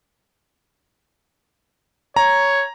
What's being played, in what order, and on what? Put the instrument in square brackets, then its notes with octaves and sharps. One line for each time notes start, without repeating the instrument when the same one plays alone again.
[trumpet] C#5 [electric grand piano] A#5